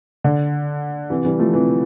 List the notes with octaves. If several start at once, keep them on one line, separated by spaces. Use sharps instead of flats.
D3
C3 E3
E3 G3
F3 A3
C3 E3